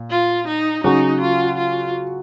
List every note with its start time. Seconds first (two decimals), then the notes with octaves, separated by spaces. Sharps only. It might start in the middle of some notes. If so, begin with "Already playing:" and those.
Already playing: A#2
0.10 F4
0.48 D#4
0.84 C#3 F#3 C#4 D#4 F#4
1.21 F4
1.57 F4